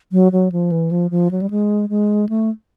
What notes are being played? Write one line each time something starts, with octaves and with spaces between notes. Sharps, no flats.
F#3
F#3
F3
E3
F3
F3
F#3
G3
G#3
G#3
A3